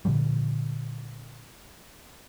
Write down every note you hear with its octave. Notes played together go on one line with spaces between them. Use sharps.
A#2 D3 F3 G3